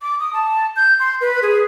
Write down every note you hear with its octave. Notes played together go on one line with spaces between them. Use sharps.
D6
D#6
A5
G6
C6
B4
G#4